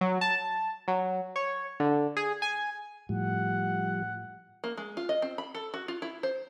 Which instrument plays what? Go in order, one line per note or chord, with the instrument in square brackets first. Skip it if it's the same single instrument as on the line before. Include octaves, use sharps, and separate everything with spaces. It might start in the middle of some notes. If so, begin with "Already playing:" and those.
[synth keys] F#3
A5
F#3
C#5
D3
G#4
G#5
[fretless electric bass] A2 [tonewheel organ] F3 G3 [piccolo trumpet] F#5
[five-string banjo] A#3
G#3
F4
D#5
C4
B5
A4
F#4
F4
E4
C5